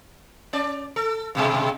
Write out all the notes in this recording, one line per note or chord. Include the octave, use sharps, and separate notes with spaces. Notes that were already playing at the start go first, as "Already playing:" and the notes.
C#4 D5
A4
G2 B2 G#3